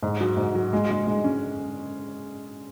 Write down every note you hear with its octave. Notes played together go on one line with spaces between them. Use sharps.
G#2
F#3
G#2
F#3
G#3
G#3
G#3
C#4